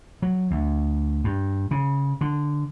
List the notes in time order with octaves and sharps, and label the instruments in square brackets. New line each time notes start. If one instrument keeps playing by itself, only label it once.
[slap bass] F#3
D2
G2
C#3
D3